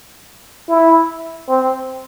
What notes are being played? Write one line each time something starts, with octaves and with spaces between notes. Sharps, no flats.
E4
C4